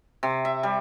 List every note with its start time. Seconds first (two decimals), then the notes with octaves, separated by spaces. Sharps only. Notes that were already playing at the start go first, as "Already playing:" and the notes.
0.23 C3
0.45 E5
0.63 G3